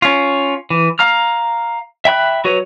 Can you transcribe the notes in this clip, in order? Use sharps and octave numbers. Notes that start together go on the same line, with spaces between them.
C#4 F4
E3
F5 A#5 F6
E5 G5 B5 F#6
F#3 F#4 B4 C#5